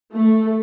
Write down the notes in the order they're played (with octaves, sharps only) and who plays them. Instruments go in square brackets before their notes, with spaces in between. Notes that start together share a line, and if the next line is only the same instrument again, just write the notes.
[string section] A3